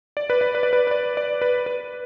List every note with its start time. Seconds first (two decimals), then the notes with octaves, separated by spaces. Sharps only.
0.17 D5
0.30 B4
0.41 D5
0.55 B4
0.63 D5
0.73 B4
0.87 B4
0.91 D5
1.17 D5
1.42 B4
1.66 B4